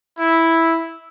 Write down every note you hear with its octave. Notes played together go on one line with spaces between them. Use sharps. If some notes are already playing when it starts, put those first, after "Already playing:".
E4